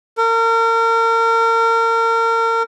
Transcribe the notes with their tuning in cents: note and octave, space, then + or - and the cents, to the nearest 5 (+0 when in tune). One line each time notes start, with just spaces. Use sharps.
A#4 -35